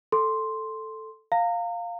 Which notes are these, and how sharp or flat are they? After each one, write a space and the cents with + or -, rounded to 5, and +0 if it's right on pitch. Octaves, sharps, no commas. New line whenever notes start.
A4 +0 C6 +0
F5 +0 A#5 -35